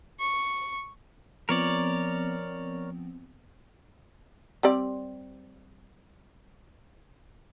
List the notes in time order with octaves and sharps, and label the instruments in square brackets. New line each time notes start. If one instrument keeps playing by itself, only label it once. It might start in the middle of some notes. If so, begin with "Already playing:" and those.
[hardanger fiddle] C#6
[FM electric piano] F3 B3 C4 [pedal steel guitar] A#4 C#5 D5
[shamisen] G3 C4 D5